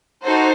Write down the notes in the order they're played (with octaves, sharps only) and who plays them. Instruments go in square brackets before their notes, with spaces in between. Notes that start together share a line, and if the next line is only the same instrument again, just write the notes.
[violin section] D#4 F#4 A4 C5